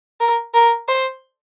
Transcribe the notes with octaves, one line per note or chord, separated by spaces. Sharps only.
A#4
A#4
C5